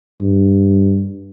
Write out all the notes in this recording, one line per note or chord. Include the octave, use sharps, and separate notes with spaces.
G2